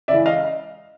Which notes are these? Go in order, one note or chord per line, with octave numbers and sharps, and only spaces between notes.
C#3 E3 G#3 D5 E5
D#5 F5